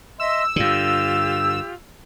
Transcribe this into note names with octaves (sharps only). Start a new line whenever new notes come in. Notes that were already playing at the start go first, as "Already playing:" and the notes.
D#5 E5 C6 E6
G2 D3 F4 G4